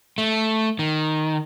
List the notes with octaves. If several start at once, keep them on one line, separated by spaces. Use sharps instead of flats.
A3
D#3